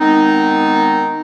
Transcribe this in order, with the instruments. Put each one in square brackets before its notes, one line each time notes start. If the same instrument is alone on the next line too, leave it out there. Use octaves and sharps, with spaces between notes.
[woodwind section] D#3 G#3 B3 C4 D#4